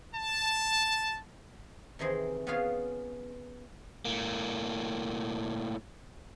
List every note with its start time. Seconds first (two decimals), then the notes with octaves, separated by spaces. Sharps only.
0.15 A5
1.99 C3 D#3 E3 G#4 C5
2.47 B3 C#4 F4 G#4 F5
4.05 A2 A#3